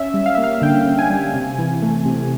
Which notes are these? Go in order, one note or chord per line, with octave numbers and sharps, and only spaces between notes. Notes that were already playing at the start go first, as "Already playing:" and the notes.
Already playing: C#4 E5
G3
F5
A#3 E5
F5
D3 G5
C#4
G#5
G3
C3
E3
A3
C3